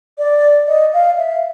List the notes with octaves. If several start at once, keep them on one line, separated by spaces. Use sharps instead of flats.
D5
D#5
F5
E5